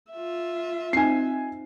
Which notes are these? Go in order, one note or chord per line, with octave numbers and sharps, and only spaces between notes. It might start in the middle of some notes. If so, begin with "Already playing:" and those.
F4 E5
C4 D#4 G#5 C7